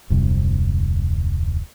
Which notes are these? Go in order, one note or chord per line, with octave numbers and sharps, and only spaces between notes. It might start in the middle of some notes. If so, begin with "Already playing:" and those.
D1 F2 C3 G3